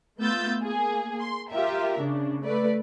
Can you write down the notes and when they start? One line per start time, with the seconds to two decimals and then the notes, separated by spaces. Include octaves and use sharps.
0.19 A3 B3 F4 E6 G6 A6
0.62 A#3 G#4
1.20 C6
1.51 F4 G4 A#4 E5
2.01 C#3 D4
2.44 A3 B4 D5